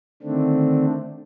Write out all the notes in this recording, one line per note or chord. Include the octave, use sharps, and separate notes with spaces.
D3 D#3 A3 C4 D4